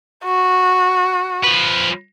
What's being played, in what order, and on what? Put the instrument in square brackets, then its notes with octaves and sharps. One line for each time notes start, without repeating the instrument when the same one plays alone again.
[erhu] F#4
[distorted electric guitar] F3 B4